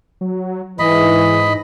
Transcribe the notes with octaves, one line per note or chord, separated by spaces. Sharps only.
F#3
G#2 E3 D#5 B5